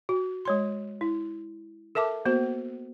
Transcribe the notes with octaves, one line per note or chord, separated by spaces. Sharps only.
F#4
G#3 C#5 C6
E4
A4 A#4 E5 A5 D6
A#3 B3 F#4 C5